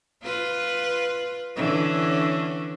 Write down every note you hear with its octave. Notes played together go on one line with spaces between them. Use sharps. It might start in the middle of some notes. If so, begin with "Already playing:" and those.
F4 B4
D3 E3 C#4